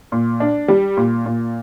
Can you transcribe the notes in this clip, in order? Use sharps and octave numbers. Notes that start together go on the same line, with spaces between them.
A#2
D4
G3
A#2
A#2